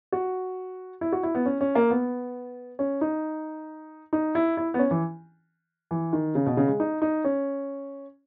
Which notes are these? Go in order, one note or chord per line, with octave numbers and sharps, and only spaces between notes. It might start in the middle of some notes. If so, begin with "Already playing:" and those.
F#4
E4
F#4
E4
B3
C#4
C#4
A#3
B3
C#4
D#4
D#4
E4
E4
B3
C#4
E3
E3
D#3
C#3
B2
C#3
G#3
D#4
D#4
C#4